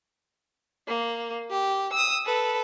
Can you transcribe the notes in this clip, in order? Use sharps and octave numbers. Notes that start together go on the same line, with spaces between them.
A#3
G4
D#6 E6
A4 B4